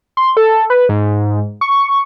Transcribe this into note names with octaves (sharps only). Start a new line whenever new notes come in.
C6
A4
B4
G#2
C#6